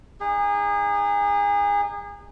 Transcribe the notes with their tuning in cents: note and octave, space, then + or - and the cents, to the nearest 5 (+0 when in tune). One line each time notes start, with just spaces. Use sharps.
D#4 -25 G#4 -30